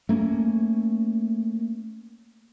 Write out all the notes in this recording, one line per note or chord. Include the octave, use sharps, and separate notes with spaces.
A3 A#3 C4 C#4